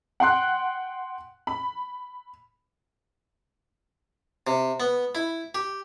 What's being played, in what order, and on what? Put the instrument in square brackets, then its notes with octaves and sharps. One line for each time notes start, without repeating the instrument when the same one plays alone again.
[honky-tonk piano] F#5 G5 C6 F#6
B5
[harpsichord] C3
B3
E4
G4